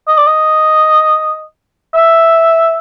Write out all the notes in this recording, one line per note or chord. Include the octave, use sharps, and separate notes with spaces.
D#5
D5
D#5
E5